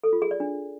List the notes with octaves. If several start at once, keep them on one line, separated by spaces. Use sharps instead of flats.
A4
F4
G#4
D5
D4